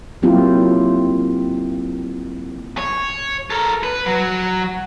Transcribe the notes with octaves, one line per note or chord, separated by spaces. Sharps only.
F#3 A#3 C4 E4 F4 G4
C#5
A4 A#4
B4
F#3